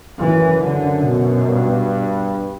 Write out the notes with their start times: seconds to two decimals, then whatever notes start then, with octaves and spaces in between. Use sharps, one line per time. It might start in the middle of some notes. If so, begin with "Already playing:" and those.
0.19 F#2 E3
0.62 F#2 D3
1.05 B2
1.49 G2